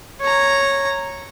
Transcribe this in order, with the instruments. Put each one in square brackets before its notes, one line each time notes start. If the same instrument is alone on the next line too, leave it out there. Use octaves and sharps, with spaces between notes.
[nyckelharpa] C#5 A#5